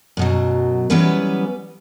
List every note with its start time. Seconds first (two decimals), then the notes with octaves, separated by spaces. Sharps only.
0.17 F#2 B2 F#3
0.90 E3 F#3 G3 B3 C#4 B4